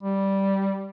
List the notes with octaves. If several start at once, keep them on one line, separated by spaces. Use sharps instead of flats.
G3